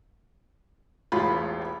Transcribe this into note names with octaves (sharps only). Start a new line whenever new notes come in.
E1 A1 F4 B5